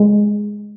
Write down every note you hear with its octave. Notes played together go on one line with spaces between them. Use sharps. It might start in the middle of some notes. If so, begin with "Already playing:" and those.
Already playing: G#3